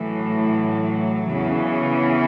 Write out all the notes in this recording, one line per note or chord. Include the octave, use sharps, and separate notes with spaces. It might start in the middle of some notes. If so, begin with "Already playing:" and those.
Already playing: A2 E3 F#3
E2 C#3 E3